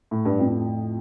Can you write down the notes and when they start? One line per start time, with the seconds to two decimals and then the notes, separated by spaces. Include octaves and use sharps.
0.11 A2
0.25 G2
0.39 F2 A2